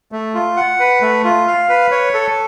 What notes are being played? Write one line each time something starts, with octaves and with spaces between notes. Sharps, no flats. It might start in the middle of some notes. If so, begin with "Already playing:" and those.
A3
F4
F#5
B4
A3
F4
F5
B4
C#5
A4